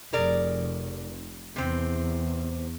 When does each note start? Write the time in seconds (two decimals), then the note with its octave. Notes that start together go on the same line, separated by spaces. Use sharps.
0.13 F1 G#4 A#4 D5
1.56 E2 C3 C4